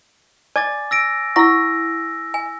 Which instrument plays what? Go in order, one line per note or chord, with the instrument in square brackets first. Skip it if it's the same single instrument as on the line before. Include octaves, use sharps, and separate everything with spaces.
[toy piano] D5 [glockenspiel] G#5 D6 A6
[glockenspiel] E6 A#6 D7
[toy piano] E4 F#5 C#6 [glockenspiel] E6 A#6
[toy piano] G#5